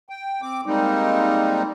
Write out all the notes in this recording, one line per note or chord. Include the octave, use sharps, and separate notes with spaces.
G5
C4 D6
G3 G#3 A#3 C4 D#4